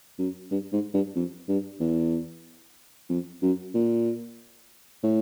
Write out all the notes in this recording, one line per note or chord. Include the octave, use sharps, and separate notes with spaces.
F#2
G2
G#2
G2
F2
G2
E2
F2
F#2
A#2
A2